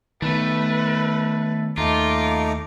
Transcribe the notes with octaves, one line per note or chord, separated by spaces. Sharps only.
D#3 A3 B3 B4
D#2 A3 D#4 F4 A#5 D6